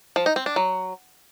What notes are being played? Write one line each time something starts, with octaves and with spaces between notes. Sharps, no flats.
F3
D#4
C4
D4
F#3